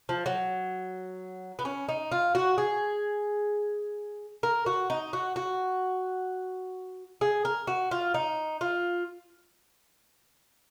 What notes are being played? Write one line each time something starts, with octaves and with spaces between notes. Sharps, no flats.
F3
F#3
B3
C#4
D#4
F4
F#4
G#4
A#4
F#4
D#4
F#4
F#4
G#4
A#4
F#4
F4
D#4
F4